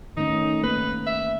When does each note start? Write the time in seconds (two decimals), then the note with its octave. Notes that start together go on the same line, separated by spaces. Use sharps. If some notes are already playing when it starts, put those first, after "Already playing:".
0.17 D#3 A3 C#4 D#4
0.63 A#3 B3 A#4 B4
1.07 E5